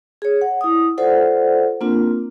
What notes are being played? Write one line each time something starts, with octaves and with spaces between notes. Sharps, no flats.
G#4 C#5
F#5
E4 D#6
F4 A4 C5 D5 F#5
A#3 C4 D4 F4 A#4